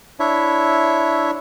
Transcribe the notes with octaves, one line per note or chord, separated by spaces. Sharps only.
D4 E4 C#5 E5